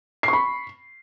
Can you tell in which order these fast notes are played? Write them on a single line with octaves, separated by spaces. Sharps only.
C7 C#6 B5